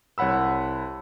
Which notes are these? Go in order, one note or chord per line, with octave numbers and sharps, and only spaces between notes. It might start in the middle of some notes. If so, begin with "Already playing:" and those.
C2 C#5 F#5 B5 E6